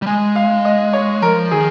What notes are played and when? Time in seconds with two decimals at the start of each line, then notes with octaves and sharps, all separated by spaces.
0.02 G3
0.07 G#3 G#5
0.36 F5
0.65 D#5
0.93 C#5
1.22 F3 A#4
1.51 D#3 G#4